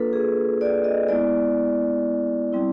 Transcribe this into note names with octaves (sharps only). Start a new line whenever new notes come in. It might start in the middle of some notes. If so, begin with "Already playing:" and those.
Already playing: A#3 D4 F4 A4 B4
G#4
D5
D#5
G#3 B3 E4 D5
G3 C4 E4